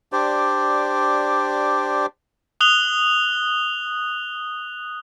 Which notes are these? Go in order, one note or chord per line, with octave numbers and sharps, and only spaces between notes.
D4 G4 C5 D5
D#6 F#6 F7 G7